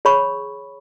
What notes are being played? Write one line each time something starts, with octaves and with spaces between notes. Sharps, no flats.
G#4 C#5 B5 C#6